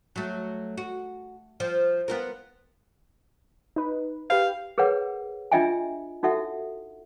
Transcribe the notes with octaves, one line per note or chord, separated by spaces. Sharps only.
F#3 A3
F#4
F3
B3 F4 A#4
D#4 B4
G4 B4 F5 G5
G#4 A#4 B4 C#5 F#5
D4 F4 D#5 E5 G5 G#5
D#4 F#4 A4 E5 F#5